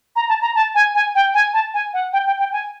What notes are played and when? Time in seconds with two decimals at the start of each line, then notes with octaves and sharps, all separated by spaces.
0.16 A#5
0.29 A5
0.42 A#5
0.55 A5
0.75 G#5
0.95 G#5
1.15 G5
1.34 G#5
1.53 A5
1.74 G#5
1.93 F#5
2.13 G5
2.27 G5
2.39 G5
2.52 G#5